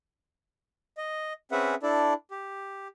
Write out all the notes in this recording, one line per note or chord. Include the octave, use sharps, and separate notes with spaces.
D#5
C4 C#4 G#4 B4 E5 F#5
D4 E4 A4 D5
G4